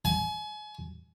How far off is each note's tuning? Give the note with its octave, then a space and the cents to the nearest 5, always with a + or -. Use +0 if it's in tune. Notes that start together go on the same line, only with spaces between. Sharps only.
G#5 +35